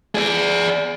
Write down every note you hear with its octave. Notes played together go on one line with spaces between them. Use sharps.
G#4 D5